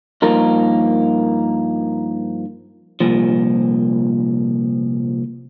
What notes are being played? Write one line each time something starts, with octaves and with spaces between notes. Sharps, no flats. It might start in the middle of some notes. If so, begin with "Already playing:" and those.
G2 F3 A#3 D#4 A#4
C2 A#2 F3